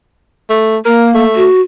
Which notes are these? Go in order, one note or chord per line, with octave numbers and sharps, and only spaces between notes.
A3
A#3 A#4
A3
F#4